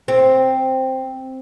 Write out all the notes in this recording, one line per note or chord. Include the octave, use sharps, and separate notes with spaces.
C4